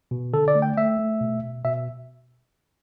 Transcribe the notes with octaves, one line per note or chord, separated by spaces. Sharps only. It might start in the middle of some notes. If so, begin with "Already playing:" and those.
B2
D3 A4
D5
A3
G5
A3 E5
A3
B2
B2
B2 E5